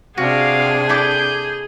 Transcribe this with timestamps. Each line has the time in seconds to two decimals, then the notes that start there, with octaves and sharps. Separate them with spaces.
0.18 C3 D4 F#4 G#4 F5
0.89 E4 A4 D6 G6